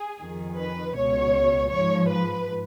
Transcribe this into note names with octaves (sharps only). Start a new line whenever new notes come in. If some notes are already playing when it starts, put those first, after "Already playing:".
Already playing: G#4
F2 D#3
B4
C#2 B2 C#5
G#2 F3 C#5
B4